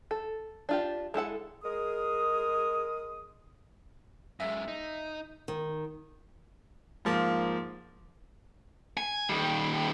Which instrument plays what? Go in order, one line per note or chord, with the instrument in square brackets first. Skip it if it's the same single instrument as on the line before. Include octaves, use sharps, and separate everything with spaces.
[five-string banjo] A4
D4 F4 G4
G#3 E4 A4 F#5
[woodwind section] G#3 G#4 A#4 D#6
[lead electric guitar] F#2 G#3 [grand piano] E5
[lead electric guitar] D#4
[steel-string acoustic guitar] D#3
[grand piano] G#2 F3 A#3
[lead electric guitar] G#5
D#3 G3